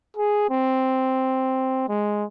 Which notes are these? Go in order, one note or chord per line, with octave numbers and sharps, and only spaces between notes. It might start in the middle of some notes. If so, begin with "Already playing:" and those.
G#4
C4
G#3